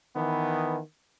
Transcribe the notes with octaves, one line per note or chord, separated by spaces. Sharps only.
D#3 E3 B3